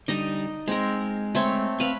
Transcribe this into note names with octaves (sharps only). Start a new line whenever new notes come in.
D3 G3 D#4 D#5
G#3 C4 A#4
A3 C4 C#5
C4 B4 F5